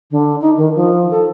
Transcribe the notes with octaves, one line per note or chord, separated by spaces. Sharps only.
D3
D#4
D#3
F3
A4